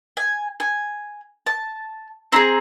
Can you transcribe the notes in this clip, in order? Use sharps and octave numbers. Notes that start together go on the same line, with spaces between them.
G#5
G#5
A5
C4 E4 G#4 A#5